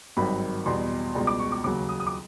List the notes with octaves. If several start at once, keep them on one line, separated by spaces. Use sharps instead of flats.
G#1 G2 D#3 F#3 B5
E2 B2 G3 C6
C#2 B2 G3
D6
C#6
D6
D#2 C#3 F#3 D6
D#6
D#6
D6